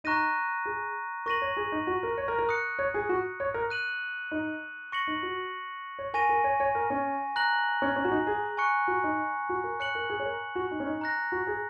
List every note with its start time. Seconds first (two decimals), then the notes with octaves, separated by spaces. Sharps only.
0.04 D#4 A#5 C#6 F#6 A#6 D#7
0.66 G#4
1.26 A#4 C#6 A#6 D#7 F#7
1.42 C#5
1.57 G#4
1.72 D#4
1.87 F#4
2.03 A#4
2.18 C#5
2.28 A#4
2.39 A#4
2.49 D#6 F#6 C#7
2.79 C#5
2.94 G#4
3.09 F#4
3.40 C#5
3.54 A#4
3.70 F#6 D#7 F#7
4.31 D#4
4.92 C#6 A#6 C#7 F#7
5.07 D#4
5.23 F#4
5.99 C#5
6.14 A#4 G#5 C#6 A#6 D#7
6.29 A#4
6.44 C#5
6.60 C#5
6.75 A#4
6.90 C#4
7.36 A#5 F#6 A#6 F#7
7.82 C#4
7.96 C#4
8.05 F#4
8.12 D#4
8.27 G#4
8.57 G#5 C#6 F#6 C#7
8.88 F#4
9.04 D#4
9.49 F#4
9.64 A#4
9.80 C#5 F#6 C#7 F#7
9.95 A#4
10.10 G#4
10.20 C#5
10.26 A#4
10.55 F#4
10.71 D#4
10.80 C#4
10.86 D#4
11.01 A#5 F#6 A#6
11.32 F#4
11.47 G#4